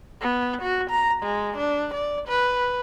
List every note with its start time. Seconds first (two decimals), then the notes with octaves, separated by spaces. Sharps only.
0.21 B3
0.62 F#4
0.90 A#5
1.23 G#3
1.57 D4
1.94 D5
2.28 B4